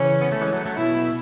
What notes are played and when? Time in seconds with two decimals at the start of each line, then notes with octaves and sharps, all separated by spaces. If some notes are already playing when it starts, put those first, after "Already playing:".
Already playing: C#3 E3 C#4
0.21 B3
0.32 A3
0.41 E3 G#3
0.53 F#3 A3
0.65 F#3 A3
0.77 B2 E4